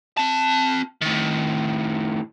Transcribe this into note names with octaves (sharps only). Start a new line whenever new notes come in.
C4 A5
A2 D#3